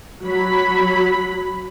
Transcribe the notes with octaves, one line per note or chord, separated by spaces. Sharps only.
F#3 B5